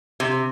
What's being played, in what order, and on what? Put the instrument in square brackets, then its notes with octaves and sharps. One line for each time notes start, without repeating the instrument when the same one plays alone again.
[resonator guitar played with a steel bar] C3